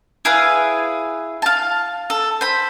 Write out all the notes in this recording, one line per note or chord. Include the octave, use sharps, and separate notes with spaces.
E4 G#4 B4 F5
F5 A5
A4
C5 B5